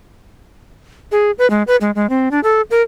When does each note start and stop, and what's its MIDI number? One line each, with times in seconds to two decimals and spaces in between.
1.12 1.31 68
1.38 1.49 71
1.50 1.63 56
1.67 1.76 71
1.81 1.91 56
1.95 2.09 56
2.09 2.29 60
2.31 2.40 62
2.44 2.61 69
2.71 2.82 70